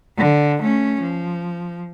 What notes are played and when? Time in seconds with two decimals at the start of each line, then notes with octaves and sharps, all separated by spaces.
0.17 D3
0.61 A3 C#4
1.01 F3